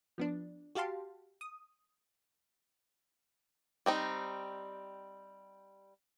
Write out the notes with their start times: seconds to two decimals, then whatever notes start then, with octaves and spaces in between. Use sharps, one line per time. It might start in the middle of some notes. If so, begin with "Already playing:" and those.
0.18 F3 B3 D4
0.75 F#4 G4 F5 A5 C6
1.41 D#6
3.86 G3 C4 D#4